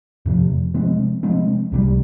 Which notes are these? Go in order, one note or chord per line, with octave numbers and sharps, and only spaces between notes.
F2 C3 F3
C3 F3 G#3 C4
C3 F3 G#3 C4
C2 C3 E3 G3